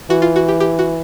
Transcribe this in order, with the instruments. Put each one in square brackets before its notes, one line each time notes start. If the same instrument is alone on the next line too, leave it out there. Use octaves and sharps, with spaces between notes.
[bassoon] E3 [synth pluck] F#4
[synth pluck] F4
F#4
G4
G4
F#4